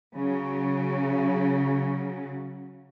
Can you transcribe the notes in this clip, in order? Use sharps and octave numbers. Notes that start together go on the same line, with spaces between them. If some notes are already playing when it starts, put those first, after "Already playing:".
C#3 F#3